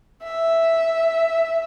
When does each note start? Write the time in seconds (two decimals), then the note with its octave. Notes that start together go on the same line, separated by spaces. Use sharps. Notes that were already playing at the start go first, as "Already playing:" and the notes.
0.24 E5